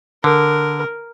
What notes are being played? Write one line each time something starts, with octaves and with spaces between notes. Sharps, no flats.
D3 A#4